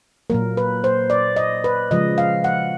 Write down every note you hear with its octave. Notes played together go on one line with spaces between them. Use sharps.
A#2 F#3 A#3 A#4
B4
C5
D5
D#5
B4
C#3 F3 G#3 D#5
F5
F#5